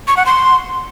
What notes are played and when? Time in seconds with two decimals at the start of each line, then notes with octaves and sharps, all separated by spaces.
0.08 C#6
0.17 F#5
0.26 C6